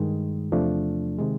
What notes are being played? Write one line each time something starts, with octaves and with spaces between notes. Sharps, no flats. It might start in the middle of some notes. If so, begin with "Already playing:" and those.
Already playing: G2 D#3 G#3
E2 C3 F3 A3 D4
C3 D#3 G#3